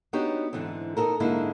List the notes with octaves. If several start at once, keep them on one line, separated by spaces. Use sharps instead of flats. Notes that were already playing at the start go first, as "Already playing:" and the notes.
B3 D4 D#4 F#4 G4 C#5
G#2 D3 E3 B3 C4
B3 D#4 F#4 A4 A#4
G#2 D3 G#3 A#3 D#4 E4